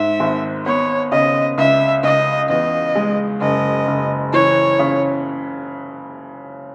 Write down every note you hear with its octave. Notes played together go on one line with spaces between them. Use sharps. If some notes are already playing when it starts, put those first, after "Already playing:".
Already playing: G#2 E5
G#1
B3 C#5
C#3 D#5
C#2 E5
C#2 D#5
E2 D#5
G#3
F#1 D#5
F#1
E3 C#5
C#3